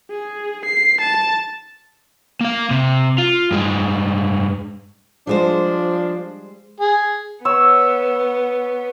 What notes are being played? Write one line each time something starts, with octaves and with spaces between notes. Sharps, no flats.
G#4
C7
A5
A#3 F5
C3
F4
G2 G#3
F3 G3 G#3 D4 C5
G#4
B3 C#5 E6